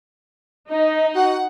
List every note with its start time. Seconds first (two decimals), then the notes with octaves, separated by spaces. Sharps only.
0.70 D#4 D#5
1.14 F#4 F#5